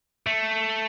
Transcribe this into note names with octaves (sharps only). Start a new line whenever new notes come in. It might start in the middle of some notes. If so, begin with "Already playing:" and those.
A3